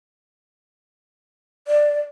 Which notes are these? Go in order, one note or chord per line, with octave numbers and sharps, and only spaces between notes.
D5